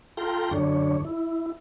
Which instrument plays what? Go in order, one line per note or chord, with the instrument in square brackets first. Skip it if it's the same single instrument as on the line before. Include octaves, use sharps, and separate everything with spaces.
[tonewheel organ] F4 A4 G5 A#5 C6
F#2 D3 D4 C#5
E4